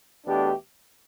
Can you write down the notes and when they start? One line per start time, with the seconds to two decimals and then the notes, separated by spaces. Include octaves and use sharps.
0.25 E2 B2 A3 D4 G4